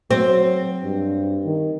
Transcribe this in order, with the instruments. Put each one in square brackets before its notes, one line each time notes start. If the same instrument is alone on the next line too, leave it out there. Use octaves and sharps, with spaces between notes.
[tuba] F#3 [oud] C4
[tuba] G2
D#3